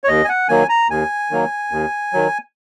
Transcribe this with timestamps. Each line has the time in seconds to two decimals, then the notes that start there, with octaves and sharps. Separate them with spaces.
0.04 C#5
0.08 D#2 D#5
0.25 G#5
0.29 F#5
0.49 D#3 F#3 A#3 G#5
0.69 A#5
0.89 D#2 G#5
1.31 D#3 F#3 A#3
1.71 D#2
2.13 D#3 F#3